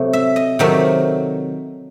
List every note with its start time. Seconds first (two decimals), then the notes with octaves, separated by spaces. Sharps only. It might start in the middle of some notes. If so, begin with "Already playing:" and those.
Already playing: C3 F#3 A3
0.13 E5
0.36 D#5
0.59 C3 D#3 F#3 A3 E5